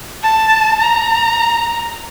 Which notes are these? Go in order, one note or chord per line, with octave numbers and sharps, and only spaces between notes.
A5
A#5